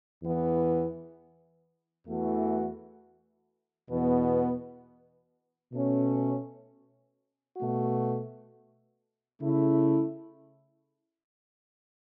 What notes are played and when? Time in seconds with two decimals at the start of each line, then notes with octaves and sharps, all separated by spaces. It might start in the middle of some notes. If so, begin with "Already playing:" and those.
0.22 E2 E3 B3
2.06 E2 E3 A3 F#4
3.89 E2 B2 B3
5.73 B2 A3 C#4
7.57 B2 A3 F#4
9.40 C#3 A3 E4